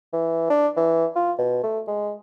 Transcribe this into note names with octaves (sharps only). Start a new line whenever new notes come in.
E3
D4
E3
F4
B2
A3
G#3